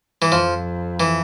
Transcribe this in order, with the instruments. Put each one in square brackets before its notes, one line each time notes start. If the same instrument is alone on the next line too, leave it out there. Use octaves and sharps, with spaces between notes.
[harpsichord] E3
[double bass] F2 [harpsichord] F3
[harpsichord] E3